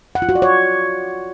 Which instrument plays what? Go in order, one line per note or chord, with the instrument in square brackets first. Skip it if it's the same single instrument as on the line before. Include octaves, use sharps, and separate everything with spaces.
[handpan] F#5
F4
F#4
D5
C#5